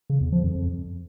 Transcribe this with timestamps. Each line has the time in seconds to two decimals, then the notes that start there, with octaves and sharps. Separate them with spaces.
0.10 C#3
0.21 E2
0.32 F3
0.44 F2